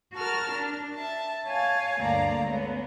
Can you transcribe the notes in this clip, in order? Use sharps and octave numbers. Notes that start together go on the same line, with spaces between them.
F#4 A#4 A5 F6
D4
E5 A5
C#5 F5 G#5 A5
D2 G2 A#3 D5 F5 A#5
G#3 A3 B3 C#4